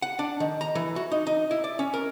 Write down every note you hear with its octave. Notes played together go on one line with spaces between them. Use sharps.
F#5
D4
D#3
A#5
E3
F#4
D#4
D#4
E4
D5
C#4
A#4